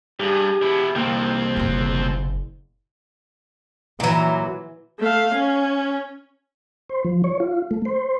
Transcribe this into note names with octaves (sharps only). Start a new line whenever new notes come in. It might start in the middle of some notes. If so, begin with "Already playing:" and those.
G2 G4 G#4
B2 E4
C2 F3 A#3 C4 G5
F#1 B2
A#2 E3 F#3
A3 F5
C#4
C5
F3
C#5
F4
A3
C5